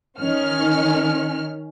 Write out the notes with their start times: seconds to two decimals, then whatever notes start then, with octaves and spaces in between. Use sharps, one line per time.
0.20 D#3 C#4 F6